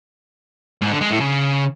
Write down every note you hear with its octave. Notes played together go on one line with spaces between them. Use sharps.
G#2
D3
G#3
A2
C#3